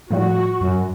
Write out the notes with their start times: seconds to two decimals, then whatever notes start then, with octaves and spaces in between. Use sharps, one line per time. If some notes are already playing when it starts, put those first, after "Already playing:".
0.11 A2 F3 G3 F#4
0.61 F#2